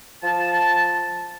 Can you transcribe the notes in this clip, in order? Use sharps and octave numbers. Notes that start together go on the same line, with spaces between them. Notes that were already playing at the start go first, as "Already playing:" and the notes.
F3 A5